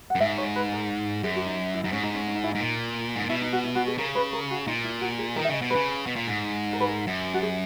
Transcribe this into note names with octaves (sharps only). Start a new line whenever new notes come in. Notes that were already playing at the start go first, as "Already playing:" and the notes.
F#5
F#2
G#2 E5
C#5
B4
A#4
F#2 G#4
F#4
D#4
E4
F#2 D#4
G#2 C#4
D#4
C#4
C#4
D#4
E4
G#2 D#4
A#2
G#2
A#2
B2 E4
D#4
F#4
E4
F#4
G#4
C#3 A#4
B4
A#4
F#4
A#2 D#4
E4
F#4
G#4
D#3 A#4
E5
C#3 D#5
B2
C#3 B4
B2
A#2
G#2
A#4
B4
A#4
F#2
F#4
G#4